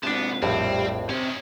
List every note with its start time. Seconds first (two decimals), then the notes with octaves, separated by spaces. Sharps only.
0.03 G#2 C3 B3 D4 A5
0.43 A#1 F2 A2 G3 C4
1.09 C3 D#3 C#4